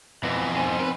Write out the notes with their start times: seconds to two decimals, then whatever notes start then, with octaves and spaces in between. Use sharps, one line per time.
0.23 F2 B2 E3
0.56 C4 G#5
0.79 A#4 B4